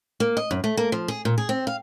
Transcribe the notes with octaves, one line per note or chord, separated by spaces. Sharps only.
A#3
D#5
F#2
A3
A#3
F3
G#4
A#2
G#4
C4
F5